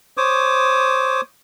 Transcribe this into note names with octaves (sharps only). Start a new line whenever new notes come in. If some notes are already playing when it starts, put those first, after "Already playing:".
C5 C#5 D6 D#6